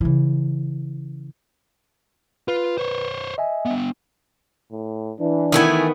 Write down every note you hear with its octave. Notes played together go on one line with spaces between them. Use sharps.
C#3 E3
F4 B4
C5 C#5
D#5 E5 G#5
B3 D4
A2
E3 D4
D#3 A3 B3 E4 G#5